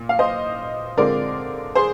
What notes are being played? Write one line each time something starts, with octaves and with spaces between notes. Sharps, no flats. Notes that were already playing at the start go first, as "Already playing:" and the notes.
Already playing: A#2
F5
C5 D#5
D3 G#3 C4 F4 A#4 D5
G#4 C5